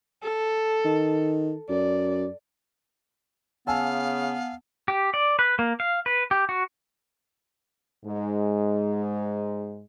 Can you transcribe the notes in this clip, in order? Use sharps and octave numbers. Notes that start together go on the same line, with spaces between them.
A4
D#3
F#2 D5
C#3 B3 F5 G#5 A5 E6
G4
D5
B4
A#3
F5
B4
G4
F#4
G#2 G#3